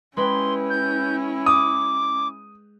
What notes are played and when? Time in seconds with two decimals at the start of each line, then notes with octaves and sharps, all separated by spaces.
0.17 G#3 C#4 E4 B4 G5 C6
0.70 G6
1.46 D6 D#6